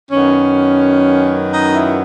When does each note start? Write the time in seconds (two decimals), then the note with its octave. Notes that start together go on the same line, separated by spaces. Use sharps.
0.11 F#2 D#3 F#3 B3 C#4
1.51 D#4
1.74 E4